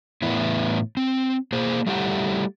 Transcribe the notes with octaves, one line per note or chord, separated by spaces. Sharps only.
A2 E3 B3 E4
C4
A#3 G#4 C5
G3 A3 E4 G4 F5 F#5